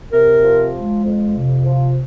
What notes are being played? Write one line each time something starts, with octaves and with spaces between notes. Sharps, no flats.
C3 A#4
F3
G#3
F2
C3
F3